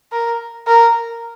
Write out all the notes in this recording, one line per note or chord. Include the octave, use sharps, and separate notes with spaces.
A#4
A#4